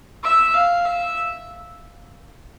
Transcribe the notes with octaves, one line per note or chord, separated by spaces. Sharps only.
E5
F5
E5